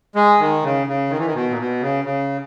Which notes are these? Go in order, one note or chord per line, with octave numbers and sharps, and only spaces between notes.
G#3
D#3
C#3
C#3
D#3
E3
D#3
B2
A#2
B2
C#3
C#3